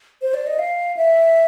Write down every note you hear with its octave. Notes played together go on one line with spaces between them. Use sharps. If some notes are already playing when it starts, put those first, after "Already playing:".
C5
D5
D#5
F5
E5